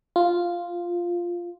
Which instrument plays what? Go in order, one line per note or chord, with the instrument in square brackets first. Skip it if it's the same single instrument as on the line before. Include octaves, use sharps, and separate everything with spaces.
[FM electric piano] F4